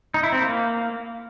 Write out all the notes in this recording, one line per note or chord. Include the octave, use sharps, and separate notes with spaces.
D#4
E4
C4
A#3